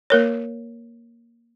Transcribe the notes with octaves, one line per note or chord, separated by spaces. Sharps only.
A#3 A#4 C#5